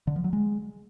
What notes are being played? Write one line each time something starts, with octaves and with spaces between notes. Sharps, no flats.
D3
F3
F#3
G#3